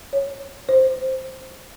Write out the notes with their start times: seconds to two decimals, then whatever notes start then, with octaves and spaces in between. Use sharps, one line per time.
0.13 C#5
0.69 C5